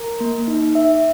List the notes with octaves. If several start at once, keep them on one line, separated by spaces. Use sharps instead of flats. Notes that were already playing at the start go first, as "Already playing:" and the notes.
Already playing: A#4
A#3
D#4
E5